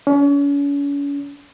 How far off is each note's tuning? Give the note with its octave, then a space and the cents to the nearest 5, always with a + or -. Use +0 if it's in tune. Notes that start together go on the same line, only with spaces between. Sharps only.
C#4 +40